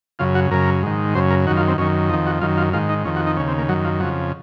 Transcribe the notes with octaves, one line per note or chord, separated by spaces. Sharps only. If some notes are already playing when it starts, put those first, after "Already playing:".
F#2 C#3 F4
F#4
F#2 C#3 A#4
G#2 D#3
F#2 C#3 C5
A#4
F#2 D#3 F#4
F4
C4
F#2 D#3 C#4
F2 D#3 D#4
F#4
F#2 D#3 F4
F4
G#2 D#3 F4
D#4
F2 D#3 C#4
F#4
D#4
D#2 C#3 C#4
C4
A#3
F#2 D#3 F#3
F3
F2 C#3 F#3